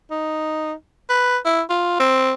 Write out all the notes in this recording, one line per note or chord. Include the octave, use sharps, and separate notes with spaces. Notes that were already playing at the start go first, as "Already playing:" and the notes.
D#4
B4
E4
F4
C4